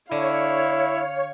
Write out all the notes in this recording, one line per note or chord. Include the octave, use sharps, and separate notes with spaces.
D3 E4 C#5 F5